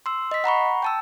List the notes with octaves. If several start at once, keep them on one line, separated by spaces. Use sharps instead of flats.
C6 E6
D#5 B6
F#5 A#5 B5 C#6
G5 A5 E6